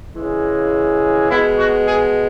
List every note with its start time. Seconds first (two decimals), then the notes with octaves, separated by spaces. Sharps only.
0.15 C#3 E3 G#3
1.29 B2 G#3 B3 E4
1.57 F#4
1.86 G#4